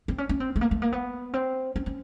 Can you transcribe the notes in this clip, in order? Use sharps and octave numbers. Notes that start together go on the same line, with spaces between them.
C4
C#4
C#4
C4
A3
A#3
A3
A#3
B3
C4
C#4
C#4